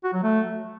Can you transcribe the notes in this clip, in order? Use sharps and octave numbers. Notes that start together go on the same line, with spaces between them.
F#4
F#3
A3